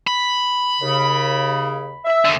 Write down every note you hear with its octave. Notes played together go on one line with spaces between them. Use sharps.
B5
D#2 C#3
E5
D#2 D3